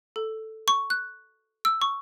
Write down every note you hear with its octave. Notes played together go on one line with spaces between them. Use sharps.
A4
C#6
F#6
E6
C#6